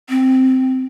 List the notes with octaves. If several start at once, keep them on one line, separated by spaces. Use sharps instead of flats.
C4